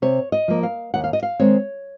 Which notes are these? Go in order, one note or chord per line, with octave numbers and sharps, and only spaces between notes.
C3 C#5
D#5
F3 A#3
F5
D#2 F#5
F5
D#5
F5
D#3 G#3 C4 C#5